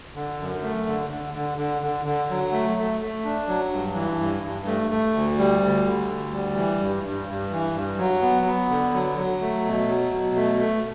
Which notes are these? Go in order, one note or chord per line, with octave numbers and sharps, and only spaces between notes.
D3
F#2
A3
D3
D3
D3
D3
D3
D3
F#3
A3
A3
A3
D4
F#3
G2
E3
G2
G2
A3
A3
D2
G3
D2
D3
D2
G3
E3
G2
G2
G2
E3
G2
F#3
B3
B3
D3
F#3
F#3
A3
B2
F#3
B2
A3
A3